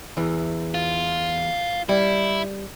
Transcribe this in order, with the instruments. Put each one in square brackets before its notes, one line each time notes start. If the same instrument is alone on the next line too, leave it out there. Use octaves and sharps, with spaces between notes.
[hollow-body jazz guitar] E2 E3
[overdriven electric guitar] F4
[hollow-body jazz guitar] G3 [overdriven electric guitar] E4